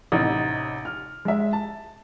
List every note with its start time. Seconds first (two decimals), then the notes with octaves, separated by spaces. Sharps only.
0.12 A1 C3 D#4
0.85 F6
1.25 G#3 E5
1.53 A5